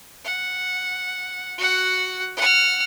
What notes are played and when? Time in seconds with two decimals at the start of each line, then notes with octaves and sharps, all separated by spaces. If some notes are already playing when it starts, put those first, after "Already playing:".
0.25 F#5
1.58 F#4 F#5
2.37 F#5 F6